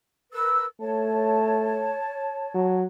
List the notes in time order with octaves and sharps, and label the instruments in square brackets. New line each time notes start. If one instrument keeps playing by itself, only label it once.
[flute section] A#4 B4 E6
[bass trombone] A3 [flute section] C#5 A5
[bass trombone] F#3